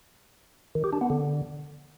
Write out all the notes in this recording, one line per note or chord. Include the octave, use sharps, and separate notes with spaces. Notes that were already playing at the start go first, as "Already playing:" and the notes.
D#3
G4
D4
B3
D3